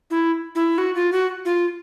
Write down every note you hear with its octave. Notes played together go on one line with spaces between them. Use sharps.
E4
E4
F#4
F4
F#4
F4